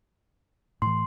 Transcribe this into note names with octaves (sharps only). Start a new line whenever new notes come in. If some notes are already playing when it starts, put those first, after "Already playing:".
A2 E3 C6